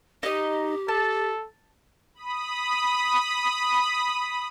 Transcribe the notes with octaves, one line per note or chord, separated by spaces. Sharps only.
D#4 G4 D#5
A4 A5
B5 D#6